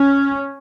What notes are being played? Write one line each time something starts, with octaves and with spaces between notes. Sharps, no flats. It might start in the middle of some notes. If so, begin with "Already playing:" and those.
Already playing: C#4